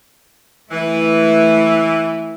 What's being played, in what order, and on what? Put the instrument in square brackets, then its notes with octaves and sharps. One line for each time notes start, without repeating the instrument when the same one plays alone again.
[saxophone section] E3 [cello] A3 E4